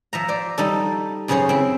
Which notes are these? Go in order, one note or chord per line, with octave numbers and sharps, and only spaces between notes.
F3 E5 A#5
C5 D5
G3 D#4 A4
F#2 C#3 G#4 C5 C#5
C4 E4